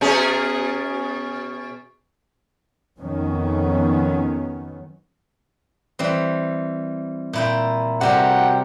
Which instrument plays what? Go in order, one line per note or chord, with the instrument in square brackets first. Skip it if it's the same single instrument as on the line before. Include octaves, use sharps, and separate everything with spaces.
[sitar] B2 C#4 G#4
[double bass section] F2 D#3 F#3 B3 C#4
[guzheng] E3 G3 C4
A#2 E4 G5
[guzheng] C3 G3 A#4 [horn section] F#4 F#5 G5